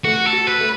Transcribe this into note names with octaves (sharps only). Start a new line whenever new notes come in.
A3 F#4
A4
F#4
B4
A3